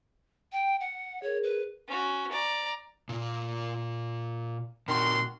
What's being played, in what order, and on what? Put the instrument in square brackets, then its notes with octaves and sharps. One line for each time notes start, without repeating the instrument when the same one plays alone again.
[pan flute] G5
F#5
[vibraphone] G#4 A#4 [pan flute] C#5
[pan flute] B4
[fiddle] C#4 F#4
D5 A#5
[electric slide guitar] A#2 F4
[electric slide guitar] A#2 C4 [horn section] D#3 F#4 C6